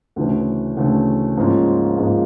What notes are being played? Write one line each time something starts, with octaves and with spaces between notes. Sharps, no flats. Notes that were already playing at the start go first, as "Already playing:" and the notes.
D2 C#3 E3 A3 C#4
D2 C#3 E3 A3 C#4
G#2 F3 A#3 C#4 F4
G#2 F3 A#3 C#4 F4